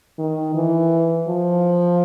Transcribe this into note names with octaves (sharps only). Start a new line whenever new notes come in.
D#3
E3
F3